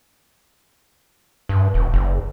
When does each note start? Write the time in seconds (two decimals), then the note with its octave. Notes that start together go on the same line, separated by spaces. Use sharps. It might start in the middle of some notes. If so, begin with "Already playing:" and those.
1.49 G2
1.74 E1
1.94 F#1